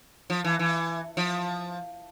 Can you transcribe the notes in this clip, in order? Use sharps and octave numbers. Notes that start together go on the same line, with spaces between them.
F3
E3
E3
F3